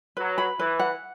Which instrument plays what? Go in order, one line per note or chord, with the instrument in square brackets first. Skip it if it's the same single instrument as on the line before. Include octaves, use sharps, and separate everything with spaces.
[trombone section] F#3 [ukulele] B4
[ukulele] B5
[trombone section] E3 [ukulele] B4
[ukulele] F#5